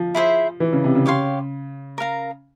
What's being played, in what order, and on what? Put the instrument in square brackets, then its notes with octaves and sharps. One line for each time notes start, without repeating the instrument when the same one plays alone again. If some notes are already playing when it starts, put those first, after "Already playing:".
Already playing: [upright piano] F3
[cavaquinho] E4 G#4 C5 E5
[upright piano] E3
C#3
C3
C#3
[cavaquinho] G4 C#5 F5 C6
A#4 F5 A#5